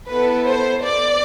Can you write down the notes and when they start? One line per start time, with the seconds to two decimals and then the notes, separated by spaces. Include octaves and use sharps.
0.11 B3 E4 A4 B4
0.49 C5
0.85 D5